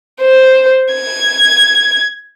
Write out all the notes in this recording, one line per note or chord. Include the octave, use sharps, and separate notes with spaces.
C5
G#6